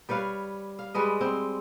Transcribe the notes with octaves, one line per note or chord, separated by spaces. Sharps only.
G3 B4 C#5 F5
F5
G3 G#3 B4 D#5
C4